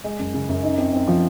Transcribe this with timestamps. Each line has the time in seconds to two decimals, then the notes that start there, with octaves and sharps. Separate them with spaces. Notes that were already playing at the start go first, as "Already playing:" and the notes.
0.04 G#3
0.19 F#2
0.34 C#3
0.49 F#2
0.63 D#4
0.78 C4
0.93 C4
1.08 F3